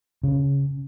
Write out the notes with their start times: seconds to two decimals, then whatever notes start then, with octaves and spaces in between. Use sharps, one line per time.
0.23 C#3